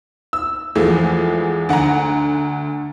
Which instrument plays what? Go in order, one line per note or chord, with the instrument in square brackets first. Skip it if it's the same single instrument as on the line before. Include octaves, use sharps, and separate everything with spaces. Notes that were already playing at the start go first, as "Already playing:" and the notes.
[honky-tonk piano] E6
E2 E3 F3 G#3 A3
D2 F#5 G#5 A#5